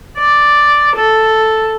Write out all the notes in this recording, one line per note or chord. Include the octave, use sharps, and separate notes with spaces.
D5
A4